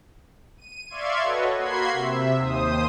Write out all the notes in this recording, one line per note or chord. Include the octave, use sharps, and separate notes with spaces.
D#7
D5 E5 F5 C6 C#6 G#6
F#4 A4 B4 C#5 D#5
A#3 F#4 B5 C6 G#6 C7
C3 E5
D#2 C5 D#6